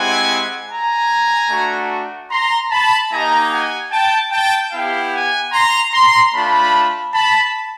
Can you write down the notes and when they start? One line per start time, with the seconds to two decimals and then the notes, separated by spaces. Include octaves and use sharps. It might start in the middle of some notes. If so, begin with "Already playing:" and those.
Already playing: G#3 C4 E4 G4 F#5 G#5
0.70 G#5 A#5
1.50 A3 D4 F#4
2.31 A#5 C6
2.71 A5 B5
3.11 A#3 D#4 G4 G#5 A#5
3.52 F#5 G#5
3.92 G5 A5
4.32 G5 A5
4.72 B3 E4 G4 F5 G5
5.12 F#5 G#5
5.52 A#5 C6
5.93 A#5 C6
6.33 A3 D4 F4 A5 B5
7.14 A5 B5